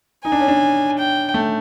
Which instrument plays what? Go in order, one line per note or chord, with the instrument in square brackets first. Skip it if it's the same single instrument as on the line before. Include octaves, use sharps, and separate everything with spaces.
[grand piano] D#4 [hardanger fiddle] G#5
[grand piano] D4
C#4
D4
[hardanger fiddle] G5
[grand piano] A3